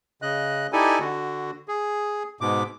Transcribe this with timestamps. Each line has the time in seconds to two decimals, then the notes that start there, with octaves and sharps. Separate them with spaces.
0.22 C#3 D#5 F#6
0.73 D#4 E4 G4 A4 D5 G#5
1.00 D3 F#4
1.68 G#4
2.41 G#2 B2 D6